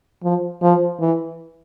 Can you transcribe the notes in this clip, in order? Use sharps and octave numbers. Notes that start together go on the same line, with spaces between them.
F3
F3
E3